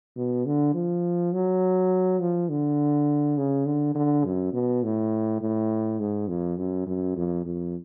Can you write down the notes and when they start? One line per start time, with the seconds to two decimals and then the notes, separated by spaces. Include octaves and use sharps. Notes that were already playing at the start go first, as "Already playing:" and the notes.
0.16 B2
0.46 D3
0.74 F3
1.33 F#3
2.20 F3
2.50 D3
3.38 C#3
3.66 D3
3.95 D3
4.25 F#2
4.54 B2
4.83 A2
5.41 A2
6.00 G#2
6.28 F2
6.58 F#2
6.87 F#2
7.17 F2
7.45 F2